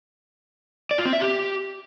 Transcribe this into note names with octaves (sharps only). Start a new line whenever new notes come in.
D5
F4
C4
E5
G4